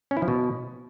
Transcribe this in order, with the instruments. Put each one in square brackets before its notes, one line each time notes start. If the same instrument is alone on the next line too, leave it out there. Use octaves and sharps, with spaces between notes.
[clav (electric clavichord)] C#4
E4
F3
B2